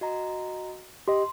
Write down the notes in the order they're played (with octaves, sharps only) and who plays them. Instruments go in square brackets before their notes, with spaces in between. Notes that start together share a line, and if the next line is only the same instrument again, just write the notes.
[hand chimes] F#4 D#5 A#5
[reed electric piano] G4 D#5 [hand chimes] C6